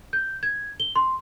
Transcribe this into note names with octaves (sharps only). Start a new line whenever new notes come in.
G6
G#6
G7
C6